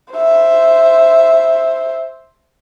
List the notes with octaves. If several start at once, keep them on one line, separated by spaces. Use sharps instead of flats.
C5 E5